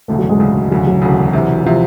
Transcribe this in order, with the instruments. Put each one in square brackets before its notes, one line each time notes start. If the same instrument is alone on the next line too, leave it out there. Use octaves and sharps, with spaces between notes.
[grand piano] E1 D2 C#3 [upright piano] A3
[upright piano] F#3
G#3
[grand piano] E1 D2 C#3
[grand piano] E1 D2 C#3 [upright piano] F#3
[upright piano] F#3
[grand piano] E1 D2 C#3
E1 E2 C3
[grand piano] C3 [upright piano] F3